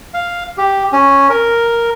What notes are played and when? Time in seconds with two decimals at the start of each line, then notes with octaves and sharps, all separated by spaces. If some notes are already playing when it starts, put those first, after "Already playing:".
0.14 F5
0.58 G4
0.92 C#4
1.30 A#4